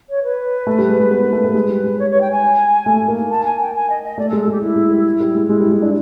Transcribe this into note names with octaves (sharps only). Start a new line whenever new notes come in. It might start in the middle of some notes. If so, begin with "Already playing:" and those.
C#5
B4
A3
G3
G#3
G#3
B3
A#3
A3
A3
G#3
G3
G#3
C#5
C#5
G5
G#5
A3
A#3
A5
G#5
G5
G#5
D#5
D#5
A3 D5
A4
G#3
A4
G#3 G4
A3 E4
G#3
G3
G3
G#3
G#3 E4
G3 E4
G#3
D4 E4